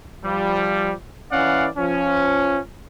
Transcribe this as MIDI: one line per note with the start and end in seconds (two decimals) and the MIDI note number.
0.25 0.93 53
0.25 0.93 55
1.31 1.68 52
1.31 1.68 61
1.31 1.68 74
1.31 1.68 77
1.31 1.68 78
1.77 2.59 53
1.77 2.59 61